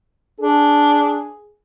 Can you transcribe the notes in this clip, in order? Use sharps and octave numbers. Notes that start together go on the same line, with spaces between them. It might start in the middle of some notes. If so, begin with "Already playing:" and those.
D4 G#4